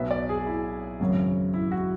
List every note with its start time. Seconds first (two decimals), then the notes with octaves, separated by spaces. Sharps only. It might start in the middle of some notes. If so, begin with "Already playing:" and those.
Already playing: B1 B2 F#3 B3 E5
0.11 D5
0.29 G#4
0.47 E4
1.00 G#1 F#2 C#3 F#3
1.54 E4
1.72 F#4